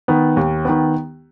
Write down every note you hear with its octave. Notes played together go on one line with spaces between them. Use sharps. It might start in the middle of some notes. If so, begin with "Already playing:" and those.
D#3 B3
D#2
D#3 B3